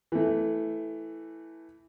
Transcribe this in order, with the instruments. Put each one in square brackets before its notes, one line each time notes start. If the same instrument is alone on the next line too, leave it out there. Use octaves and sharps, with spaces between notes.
[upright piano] E3 A3